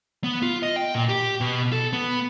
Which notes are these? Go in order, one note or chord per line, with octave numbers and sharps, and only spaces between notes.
B3
F4
D#5
G5
A#2
G4
B2
A4
B3